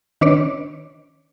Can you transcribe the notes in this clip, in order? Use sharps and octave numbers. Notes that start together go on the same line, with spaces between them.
D#3 C#4 D4 B4 C#5 D5